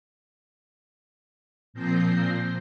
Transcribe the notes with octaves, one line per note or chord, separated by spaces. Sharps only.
A#2 F3 C4 G6 A#6 C7